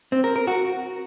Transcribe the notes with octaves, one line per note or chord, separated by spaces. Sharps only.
C4
A#4
A#4
F#4